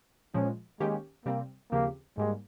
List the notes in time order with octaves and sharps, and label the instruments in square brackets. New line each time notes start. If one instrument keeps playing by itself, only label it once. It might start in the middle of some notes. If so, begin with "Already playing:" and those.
[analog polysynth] A#2 F3 G#3 [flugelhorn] C#4
[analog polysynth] D#3 A#3 C#4 G4 [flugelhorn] G#3
[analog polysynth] C3 G3 C4 [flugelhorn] A#3
[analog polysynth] D#2 C#3 F3 C4 G4 [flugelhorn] A#3
[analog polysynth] G#2 G3 A#3 [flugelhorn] G#3